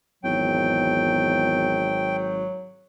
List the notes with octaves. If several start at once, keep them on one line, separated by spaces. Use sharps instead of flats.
G#1 E2 F#3 G5